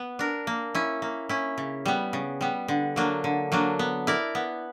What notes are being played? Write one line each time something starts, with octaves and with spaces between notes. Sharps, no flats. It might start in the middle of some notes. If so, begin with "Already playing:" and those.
Already playing: B3
D4 A#4
A#3
C#4 E4
A#3
C#4 E4
C#3
G3 B3
C#3
G3 B3
D3
F#3 A#3 D4
D3
F#3 A#3 D4
B3
E4 A#4 D5
B3